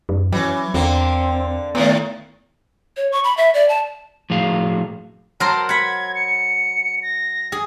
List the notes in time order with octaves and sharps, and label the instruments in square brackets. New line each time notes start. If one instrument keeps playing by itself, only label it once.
[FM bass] F#2
[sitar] E3 [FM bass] F#3 [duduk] C#4
[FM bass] E2 [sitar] D3 A#3 [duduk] C4
[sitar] A2 D#3 [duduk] A3 [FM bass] B3
[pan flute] C#5
C#6
B5
E5
D5
A5
[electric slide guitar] A2 F3 F#3 G#4 F5
[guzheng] F#3 A#4 C5 [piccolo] A5
[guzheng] F#5 B5 [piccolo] G#6
[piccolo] C#7
A#6
[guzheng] G#4